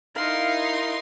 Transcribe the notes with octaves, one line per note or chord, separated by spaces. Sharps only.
D#4 E4 A#4 F5 C6